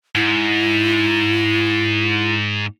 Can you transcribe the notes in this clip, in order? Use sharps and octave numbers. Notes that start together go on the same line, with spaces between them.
G#2 E4